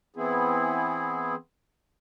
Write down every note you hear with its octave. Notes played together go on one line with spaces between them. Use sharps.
E3 B3 C4 E4 G#4